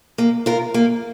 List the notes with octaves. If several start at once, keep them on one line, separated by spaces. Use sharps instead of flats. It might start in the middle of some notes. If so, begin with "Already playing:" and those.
A#3
F4 A#4
A#3